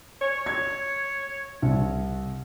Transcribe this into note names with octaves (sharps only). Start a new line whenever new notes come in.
C#5
G#6
C2